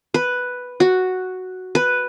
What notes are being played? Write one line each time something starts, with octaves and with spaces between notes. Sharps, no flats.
B4
F#4
B4